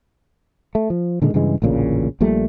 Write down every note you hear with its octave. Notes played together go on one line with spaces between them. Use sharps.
A3
F3
A#2 D3 D#3 G#3
G2 C#3 E3 G#3
A1 D2 A#2 C#3
A#1 A#2 G3 A3